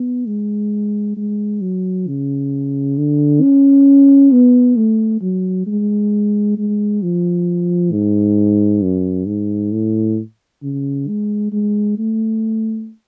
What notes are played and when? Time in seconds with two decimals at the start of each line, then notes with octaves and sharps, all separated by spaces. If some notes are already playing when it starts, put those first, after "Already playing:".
Already playing: B3
0.27 G#3
1.17 G#3
1.61 F#3
2.07 C#3
2.98 D3
3.42 C#4
4.32 B3
4.76 A3
5.21 F#3
5.66 G#3
6.57 G#3
7.02 F3
7.92 G#2
8.82 F#2
9.27 G#2
9.72 A2
10.62 C#3
11.08 G#3
11.52 G#3
11.98 A3